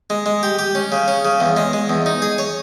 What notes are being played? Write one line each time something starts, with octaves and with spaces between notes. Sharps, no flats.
G#3
G#3
G4
G4
C#4
C#3
C#4
C#3
E2
G#3
G#3
E2
D#4
G#4
C#5